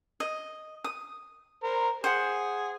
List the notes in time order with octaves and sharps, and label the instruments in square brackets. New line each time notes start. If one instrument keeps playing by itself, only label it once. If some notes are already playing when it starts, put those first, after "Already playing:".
[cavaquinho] D#5
D#6
[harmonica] A#4 C5
[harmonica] G#4 [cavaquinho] C5 F#5